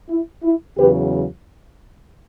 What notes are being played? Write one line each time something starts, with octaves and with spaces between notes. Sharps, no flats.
E4
E4
E2 C#3 F#3 G4 B4